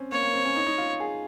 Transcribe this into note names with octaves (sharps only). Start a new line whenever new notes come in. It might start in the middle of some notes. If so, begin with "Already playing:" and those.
Already playing: C4 C#4
A#3 C#5
A#3
C4
C#4
D#4
D#4
F4
G#4